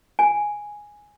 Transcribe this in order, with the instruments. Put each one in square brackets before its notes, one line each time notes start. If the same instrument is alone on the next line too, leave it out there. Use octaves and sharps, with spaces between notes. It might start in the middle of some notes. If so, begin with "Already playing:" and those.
[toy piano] G#5